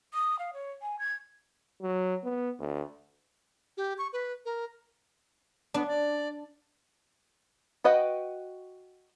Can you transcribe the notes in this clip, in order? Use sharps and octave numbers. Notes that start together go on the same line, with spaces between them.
D#6
F5
C#5
G#5
G#6
F#3
B3
D2
G4
C#6
B4
A#4
B3 D4
D5
F#4 B4 D#5 F#5 G5